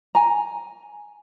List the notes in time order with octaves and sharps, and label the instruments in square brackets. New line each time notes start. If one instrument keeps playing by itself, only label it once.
[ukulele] G#5 A#5